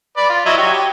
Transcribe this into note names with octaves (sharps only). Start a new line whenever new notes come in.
B4 D5
F4
F#3 E4 D#5
F#4 G4 C#5
G4